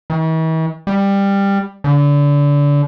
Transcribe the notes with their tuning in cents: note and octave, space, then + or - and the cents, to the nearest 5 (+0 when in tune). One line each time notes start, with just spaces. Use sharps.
E3 -45
G3 +15
D3 -30